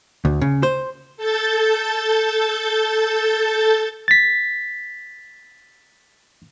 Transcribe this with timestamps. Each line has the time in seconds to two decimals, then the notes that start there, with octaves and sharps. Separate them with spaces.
0.25 D2
0.41 C#3
0.63 C5
1.17 A4 G6 A6
4.08 A6 B6